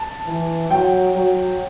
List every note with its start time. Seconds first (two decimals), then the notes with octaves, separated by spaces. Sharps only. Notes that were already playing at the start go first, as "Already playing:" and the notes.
Already playing: A5
0.26 E3
0.70 F#3 G5
1.15 F#3